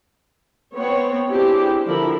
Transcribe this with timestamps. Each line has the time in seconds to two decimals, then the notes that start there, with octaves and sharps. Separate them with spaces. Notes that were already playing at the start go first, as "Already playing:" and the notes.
0.75 B3 C4 B4 C#5
1.30 C4 D4 E4 G4 G#4
1.86 D3 F3 E4 A#4 B5